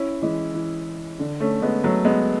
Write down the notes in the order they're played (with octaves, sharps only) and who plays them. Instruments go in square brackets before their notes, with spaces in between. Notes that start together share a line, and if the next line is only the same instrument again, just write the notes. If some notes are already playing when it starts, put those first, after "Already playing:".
Already playing: [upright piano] C#4 E4
E3 G#3
E3
D3
A3 C#4
G#3 B3
F#3 A3
G#3 B3